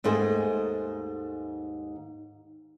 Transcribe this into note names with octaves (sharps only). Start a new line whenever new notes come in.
D#2 G#2 A3 G#4 C5